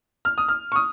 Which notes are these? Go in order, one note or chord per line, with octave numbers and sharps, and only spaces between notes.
F6
D#6
F6
C#6
D#6